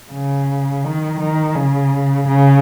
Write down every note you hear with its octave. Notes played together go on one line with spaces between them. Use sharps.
C#3
D#3
D#3
C#3
C#3